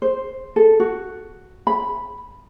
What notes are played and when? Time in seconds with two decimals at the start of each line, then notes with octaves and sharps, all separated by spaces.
0.02 C5
0.56 A4
0.80 F#4
1.67 B5